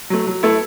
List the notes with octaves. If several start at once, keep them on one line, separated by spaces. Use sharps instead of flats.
F#3 A3
F#3
A3 E4 A4